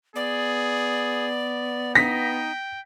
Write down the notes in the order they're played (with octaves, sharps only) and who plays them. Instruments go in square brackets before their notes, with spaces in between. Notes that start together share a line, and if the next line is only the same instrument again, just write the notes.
[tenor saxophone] B3 [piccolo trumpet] G#4 [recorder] D5
[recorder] D#4 [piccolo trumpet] G5 [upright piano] A#6 B6